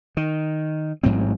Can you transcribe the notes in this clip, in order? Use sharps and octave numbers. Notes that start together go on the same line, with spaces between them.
D#3
A1 G#2 F#3 C4